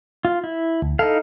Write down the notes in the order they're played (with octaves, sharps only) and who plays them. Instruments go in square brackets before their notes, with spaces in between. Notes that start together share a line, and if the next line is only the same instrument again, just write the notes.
[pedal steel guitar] F4
E4
[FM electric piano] D2
[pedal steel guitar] D#4 E4 F5 [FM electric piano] A4